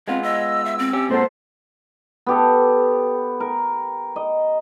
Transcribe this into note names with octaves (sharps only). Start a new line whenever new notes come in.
G#3 B3 C4 F4
D#5 E6
E5
C4
C#4 G4
A#2 G#3 B3 A4 C5
B3 G4 A4
A#4
D#5